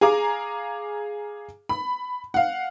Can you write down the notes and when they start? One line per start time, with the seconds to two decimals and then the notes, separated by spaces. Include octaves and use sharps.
0.01 G#4 F5 G#5 A#5 D6
1.69 B5
2.34 F5 F#5